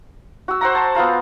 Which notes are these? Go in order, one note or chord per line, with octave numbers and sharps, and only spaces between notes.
F#4 E6
C5 F#5 A#5
A5
B3 F4 F5 A#5